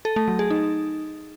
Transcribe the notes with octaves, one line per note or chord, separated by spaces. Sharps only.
A4
A3
F#3
G#4
D#4